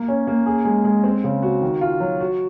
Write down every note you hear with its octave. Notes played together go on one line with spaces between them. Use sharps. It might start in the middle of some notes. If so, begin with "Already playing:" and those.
Already playing: A#3
C#4
A#3
G#4
G#3
G#3
C4
C#3
F#4
D#3
F4
F#3
F#4